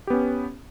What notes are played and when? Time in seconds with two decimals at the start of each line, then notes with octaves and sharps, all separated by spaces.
0.07 G4
0.10 B3
0.13 C#4